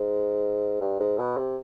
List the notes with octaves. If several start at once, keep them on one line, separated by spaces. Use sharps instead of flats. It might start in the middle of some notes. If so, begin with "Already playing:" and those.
Already playing: G#2
G2
G#2
B2
C3